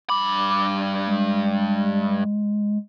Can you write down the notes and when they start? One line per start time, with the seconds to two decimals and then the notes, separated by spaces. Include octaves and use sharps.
0.09 G2 B5 D6
1.07 G#3